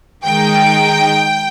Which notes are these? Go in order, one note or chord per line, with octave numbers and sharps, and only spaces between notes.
D#3 G#3 D#4 G5